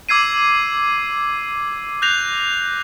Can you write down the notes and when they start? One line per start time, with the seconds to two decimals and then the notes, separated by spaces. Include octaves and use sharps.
0.09 D6 E6 G#6 C7 D#7
2.02 F#6 G6 A#6 C7 F7